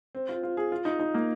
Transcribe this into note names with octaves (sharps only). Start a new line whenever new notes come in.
C4
F4
F4
G#4
F4
D#4
D#4
A#3